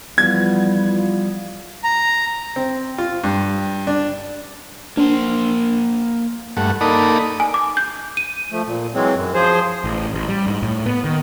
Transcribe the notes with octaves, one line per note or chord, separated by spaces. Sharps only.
E2 F3 G3 B3 F4 G#6
A#5
C4
F4
G2
D4
A#3 D4 C5
G2 A3 F#5
A#3 D#4 A4 D5 B5 D#6
G#5
D6
G6
D#7
F3 A3
A#2
E3 F#3 G#3 C4
F#2
F3 G#4 C5
A1
A1
G3
G#2
A2
B3
D#3